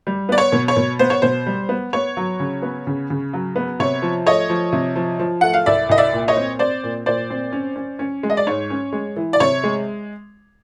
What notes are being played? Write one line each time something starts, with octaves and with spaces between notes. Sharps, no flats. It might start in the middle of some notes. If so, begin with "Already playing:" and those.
G3
B3 D5
C#5
B2
C#5
B2
B3 C5
C#5
B2 C5
G3
B3
B3 C#5
F#3
C#3
B3
C#3
C#3
F#3
B3
C3 C#5
F3
A3 C#5 D#5
F3
C3
F3
F3
A3 F#5
F5
C2 D5 E5
C2 D#5
D5 E5
A#2
C#5 D#5
C4
C4 C5 D5
A#2
A#2 C5 D5
C4
C#4
C#4
C#4
G#3
D#5
D5
G#2 C#5
C#4
G#3
E3
D5
C3 C#5
G#3